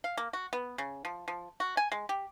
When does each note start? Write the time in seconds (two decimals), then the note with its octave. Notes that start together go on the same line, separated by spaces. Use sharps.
0.04 F5
0.17 A#3
0.33 F#4
0.53 B3
0.78 C#3
1.05 F3
1.28 F3
1.60 F#4
1.77 G#5
1.92 G#3
2.09 G4